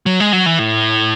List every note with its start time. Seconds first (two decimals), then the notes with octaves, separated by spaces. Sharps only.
0.06 F#3
0.20 G#3
0.32 F#3
0.46 E3
0.59 A2